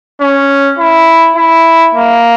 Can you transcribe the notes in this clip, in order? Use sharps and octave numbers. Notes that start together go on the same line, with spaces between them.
C#4
E4
E4
A#3